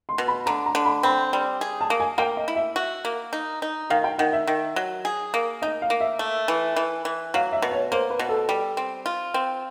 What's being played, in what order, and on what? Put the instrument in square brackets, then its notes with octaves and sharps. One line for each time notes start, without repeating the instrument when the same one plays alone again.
[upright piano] C6
[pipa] B2
[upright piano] B5
[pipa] D3 [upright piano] A#5
[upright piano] A#5
[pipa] D3
[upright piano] B5
[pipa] C4 [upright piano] B5
[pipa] G3
G#4
[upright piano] A5
[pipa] A#3
[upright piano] G#5
[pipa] A#3 [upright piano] G5
[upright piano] D#5
[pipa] E4
[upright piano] E5
[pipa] F#4
A#3
D#4
D#4
[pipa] D#3 [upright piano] F5
[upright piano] G5
[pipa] D#3 [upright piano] F#5
[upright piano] E5
[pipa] D#3
F#3
G#4
A#3
[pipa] D#4 [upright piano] D#5
[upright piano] F5
[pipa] A#3
[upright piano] E5
[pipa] A3
E3
E3
E3
[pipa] F#3 [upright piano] F5
[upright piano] E5
[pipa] B2
[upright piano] C#5
[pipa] A#3 [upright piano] C5
[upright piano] B4
[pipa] B2
[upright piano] A4
[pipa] G3
C4
F4
C4